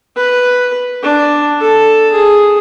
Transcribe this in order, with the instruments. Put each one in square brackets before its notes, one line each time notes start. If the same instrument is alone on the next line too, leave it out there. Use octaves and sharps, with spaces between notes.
[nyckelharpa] B4
D4
A4
G#4